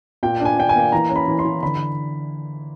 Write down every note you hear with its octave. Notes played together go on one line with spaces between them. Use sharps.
A#2 G5
D4 G#5
D4 G5
G#5
A#3
E3 A#5
C#4
B5
E3
C6
E3
D3 B5